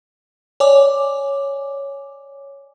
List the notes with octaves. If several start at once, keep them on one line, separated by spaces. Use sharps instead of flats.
C#5 D5 G#5 D6